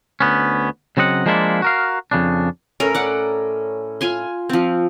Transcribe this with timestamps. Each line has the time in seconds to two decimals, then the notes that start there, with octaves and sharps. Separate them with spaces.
0.21 D2 B3 C#4
0.97 C#3 F#3 C4 D#5 F#5
1.26 F3 G#3 A#3 D4 E4 F4
1.62 F#4 A#4 F5
2.11 F2 C#3 D4
2.80 A2 C#4 A#4
2.95 D5 F#5
4.01 F4 G#5 C6
4.49 F3 C4